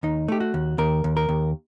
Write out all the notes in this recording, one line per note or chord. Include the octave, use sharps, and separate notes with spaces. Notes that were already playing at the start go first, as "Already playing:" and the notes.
D#2 D#4
A3 G4
F#4
D#2
D#2 A#4
D#2
A#4
D#2